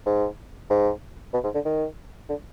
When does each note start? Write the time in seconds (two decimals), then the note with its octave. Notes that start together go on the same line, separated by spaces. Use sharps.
0.06 G#2
0.70 G#2
1.34 B2
1.44 G#2
1.55 D3
1.65 D#3
2.29 D3